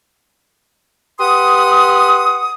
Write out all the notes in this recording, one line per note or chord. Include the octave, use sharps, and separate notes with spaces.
G4 B4 F#5 C6 D#6